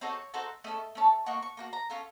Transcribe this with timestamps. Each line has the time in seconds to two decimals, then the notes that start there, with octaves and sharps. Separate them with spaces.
0.01 C4 D#4 F#4 A4 C#5
0.34 C4 D#4 F#4 A4
0.64 A3 C#4 A4 D#5
0.95 A3 C#4 A4
1.26 A#3 D#4 F#4 C#6
1.42 C#6
1.57 A#3 D#4 F#4
1.73 A#5
1.90 C#4 F4 A4